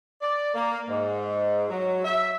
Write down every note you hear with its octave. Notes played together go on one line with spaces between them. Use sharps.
D5
A#3
G#2
F#3
E5